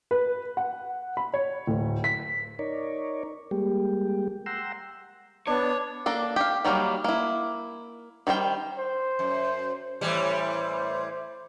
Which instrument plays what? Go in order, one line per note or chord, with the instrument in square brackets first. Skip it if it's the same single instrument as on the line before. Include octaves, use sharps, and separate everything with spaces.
[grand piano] B4
F#5
B5
C#5
D1
B6
[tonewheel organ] D#4 A#4 C#5 D5
G3 G#3 A#3 G4
F#5 G5 A#5 C6 E6
[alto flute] B3 [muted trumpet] D4 [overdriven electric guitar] C#5
[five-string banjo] A#3 D4 A4
G4 F5
D#3 F#3 G3 A#3
A#3 E4
D#3 G3 C5 G5
[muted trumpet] C5
[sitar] F#2
[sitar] A2 E3 G3 [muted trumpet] C5